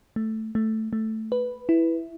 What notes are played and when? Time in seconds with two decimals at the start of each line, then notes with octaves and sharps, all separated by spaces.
0.16 A3
0.55 A3
0.93 A3
1.32 B4
1.69 E4